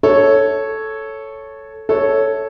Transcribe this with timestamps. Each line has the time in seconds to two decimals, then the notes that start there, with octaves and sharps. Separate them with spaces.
0.03 A4 C#5
1.89 A4 C#5